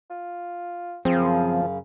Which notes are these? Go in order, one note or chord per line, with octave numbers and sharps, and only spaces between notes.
F4
F#2 C#3 F3 C4 G#4